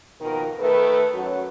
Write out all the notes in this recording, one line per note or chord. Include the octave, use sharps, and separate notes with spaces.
F2 B2 D#3 F4 A#4
D#3 A3 A4 B4
F#2 F#3